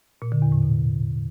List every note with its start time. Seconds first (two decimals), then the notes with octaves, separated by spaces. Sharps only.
0.22 A#2
0.32 D3
0.42 E2
0.52 A2
0.62 B2